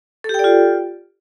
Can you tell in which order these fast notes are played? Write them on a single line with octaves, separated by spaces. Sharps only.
A4 G4 G5 D5 F4